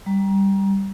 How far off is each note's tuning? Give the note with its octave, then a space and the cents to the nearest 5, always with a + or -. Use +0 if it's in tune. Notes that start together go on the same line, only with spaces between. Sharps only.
G3 +0 A#5 +20